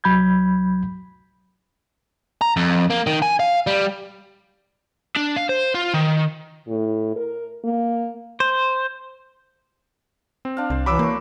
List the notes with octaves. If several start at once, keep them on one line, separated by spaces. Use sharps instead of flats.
C2 F#3 B5 G6 G#6
A#5
F2
A#3
D#3
G#5
F5
G3
D4
F5
C5
F4
D#3
A2
A#4
A#3
C5
C4
D4 F5
C2 C5
E3 F#3 B5 D6 E6
A#3 C5 C#6